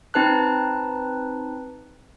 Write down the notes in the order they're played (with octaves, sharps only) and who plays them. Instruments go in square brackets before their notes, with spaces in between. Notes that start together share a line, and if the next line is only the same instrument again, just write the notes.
[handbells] C4 D#4 B4 A5 F#6